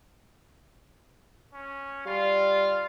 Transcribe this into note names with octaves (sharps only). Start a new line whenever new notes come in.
C#4
G3 F4 F5